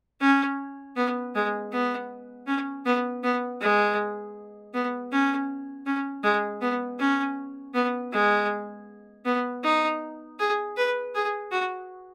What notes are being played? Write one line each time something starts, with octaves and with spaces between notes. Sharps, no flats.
C#4
B3
G#3
B3
C#4
B3
B3
G#3
B3
C#4
C#4
G#3
B3
C#4
B3
G#3
B3
D#4
G#4
B4
G#4
F#4